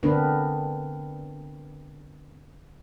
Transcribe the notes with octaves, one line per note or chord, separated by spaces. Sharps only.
D3 B3 C4 D4 A#4 B4